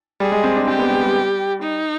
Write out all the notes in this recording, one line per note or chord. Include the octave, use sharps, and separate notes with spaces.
G3 G#4
G#3
C4
D4
C4 G4
B3
G#3
G3
D#4